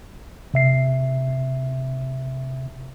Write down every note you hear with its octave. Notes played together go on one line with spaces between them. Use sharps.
C3 E5 C7